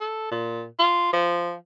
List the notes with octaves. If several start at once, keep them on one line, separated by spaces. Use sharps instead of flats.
A4
A#2
F4
F3